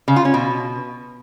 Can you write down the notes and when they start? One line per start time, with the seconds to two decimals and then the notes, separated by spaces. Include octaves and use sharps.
0.08 C#3
0.16 F4
0.25 C#4
0.34 B2